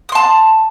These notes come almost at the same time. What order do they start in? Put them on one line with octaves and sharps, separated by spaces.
D#6 C6 A5